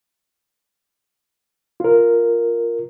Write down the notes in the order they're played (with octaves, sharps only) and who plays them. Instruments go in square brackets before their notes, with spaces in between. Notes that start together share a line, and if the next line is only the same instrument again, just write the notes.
[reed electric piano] F4 A#4